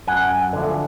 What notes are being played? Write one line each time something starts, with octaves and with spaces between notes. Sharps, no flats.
F#2 F#5 G#5
D3 F3 A3